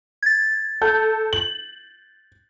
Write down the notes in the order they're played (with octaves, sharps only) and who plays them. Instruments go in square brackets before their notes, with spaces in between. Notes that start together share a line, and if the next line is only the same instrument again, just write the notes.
[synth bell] G#6 A6
[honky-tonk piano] A4 G6
F#7